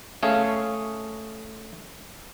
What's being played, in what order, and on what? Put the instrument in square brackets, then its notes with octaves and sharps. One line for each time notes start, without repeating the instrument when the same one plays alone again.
[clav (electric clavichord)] A3 C#4 G#4 F5